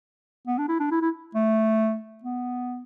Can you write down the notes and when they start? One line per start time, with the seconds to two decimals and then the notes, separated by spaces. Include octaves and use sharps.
0.47 B3
0.58 D4
0.68 E4
0.80 D4
0.91 E4
1.02 E4
1.35 A3
2.24 B3